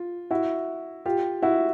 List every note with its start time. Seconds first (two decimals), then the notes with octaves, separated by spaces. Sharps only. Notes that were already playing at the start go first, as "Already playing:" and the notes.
Already playing: F4
0.31 E4 F#4
1.05 F4 G4
1.42 E4 F#4